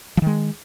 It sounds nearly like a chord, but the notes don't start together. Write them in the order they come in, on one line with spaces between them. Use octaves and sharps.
F3 D#3 G#3